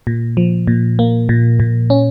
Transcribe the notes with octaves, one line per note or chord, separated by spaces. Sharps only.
A#2
F3
A#2
A#3
A#2
A#2
C#4